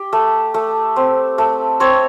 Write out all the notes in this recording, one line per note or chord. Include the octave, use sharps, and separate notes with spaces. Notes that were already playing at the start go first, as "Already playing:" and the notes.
Already playing: G4
A3
A3
C4
A3
C4 C#5